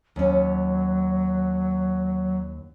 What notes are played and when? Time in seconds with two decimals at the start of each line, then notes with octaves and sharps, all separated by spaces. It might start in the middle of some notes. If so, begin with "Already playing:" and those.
0.16 D#2 F#3 C#4